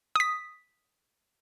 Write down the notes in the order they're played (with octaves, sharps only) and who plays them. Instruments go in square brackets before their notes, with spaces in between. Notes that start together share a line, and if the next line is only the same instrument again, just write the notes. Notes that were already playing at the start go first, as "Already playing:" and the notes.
[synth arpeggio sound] D#6 B6